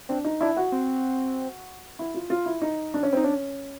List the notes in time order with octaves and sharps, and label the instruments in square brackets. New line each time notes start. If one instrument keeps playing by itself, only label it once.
[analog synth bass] C4 [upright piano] D4
[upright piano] D#4
[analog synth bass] D4 [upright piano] E4
[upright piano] F#4
[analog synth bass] C4
[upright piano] E4
F4
F4
E4
D#4
D4
C#4
[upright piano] C4 [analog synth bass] D#4
[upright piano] C#4 [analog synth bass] D4